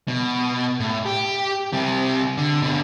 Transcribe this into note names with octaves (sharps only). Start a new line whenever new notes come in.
B2
A2
G4
C3 G3
D3
B2 D3